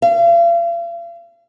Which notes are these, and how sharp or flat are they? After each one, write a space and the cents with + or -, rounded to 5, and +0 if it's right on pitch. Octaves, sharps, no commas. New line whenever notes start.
F5 -40